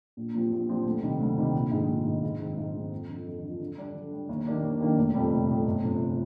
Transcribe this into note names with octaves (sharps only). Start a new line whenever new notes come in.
A#1
A#2 F3 C4 G4
A#1
A#2 F3 C4 G4
D2
C3 D#3 G3
D2
C3 D#3 G3
A#1
G#2 D#3 G#3
A#1
G#2 D#3 G#3
G#2
D#3 G#3 C4
G#2
D#3 G#3 C4
F2
D3 F3
F2
D3 F3
D3
G3 D4
D3
G3 D4
D#2
D#3 A#3 D4 G4
D#2
D#3 A#3 D4 G4
F1
F2 C3 G3
F1
F2 C3 G3
G1
F2 C3 F3